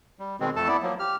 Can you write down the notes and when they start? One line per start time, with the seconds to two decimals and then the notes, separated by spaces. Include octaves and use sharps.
0.19 G3
0.40 B2 D#3 G#3 C4
0.56 F2 A3 A4 A5
0.68 B3 E4 D5
0.83 F3 F#3 A#3
0.99 G4 F6